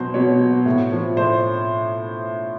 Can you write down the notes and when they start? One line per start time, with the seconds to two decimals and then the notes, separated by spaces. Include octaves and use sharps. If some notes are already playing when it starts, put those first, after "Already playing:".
Already playing: B2 F#3 C5
0.14 B2 C#5
0.40 F#3
0.66 A2
0.92 F3
1.17 A2 C5